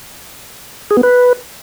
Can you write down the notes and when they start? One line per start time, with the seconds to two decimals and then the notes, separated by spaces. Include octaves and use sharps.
0.91 G#4
0.97 B3
1.03 B4